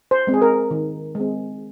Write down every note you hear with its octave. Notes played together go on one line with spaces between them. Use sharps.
C5
G#3 C4
G#4
A#4
D#3
G#3 C4